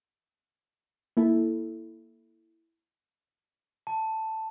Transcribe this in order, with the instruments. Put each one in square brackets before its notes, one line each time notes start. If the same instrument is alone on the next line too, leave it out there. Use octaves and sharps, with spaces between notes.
[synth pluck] A#3 E4 A4
[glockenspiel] A5